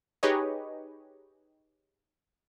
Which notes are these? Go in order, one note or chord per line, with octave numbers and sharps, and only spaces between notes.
D#4 G4 G#4 B4 C#5 D#5